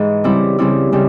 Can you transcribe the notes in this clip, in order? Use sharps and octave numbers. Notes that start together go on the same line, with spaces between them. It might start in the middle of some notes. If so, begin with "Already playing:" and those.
Already playing: G#2 E3 G#3
C#3 G3 C4 E4
C#3 G3 C4 E4
C#3 G3 C4